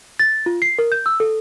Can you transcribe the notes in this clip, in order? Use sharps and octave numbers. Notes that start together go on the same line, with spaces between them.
A6
F4
C7
A#4
G6
E6
A4